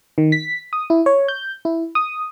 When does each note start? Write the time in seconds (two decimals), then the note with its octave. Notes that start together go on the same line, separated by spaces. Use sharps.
0.18 D#3
0.32 B6
0.73 D#6
0.90 E4
1.06 C#5
1.28 G6
1.65 E4
1.95 D#6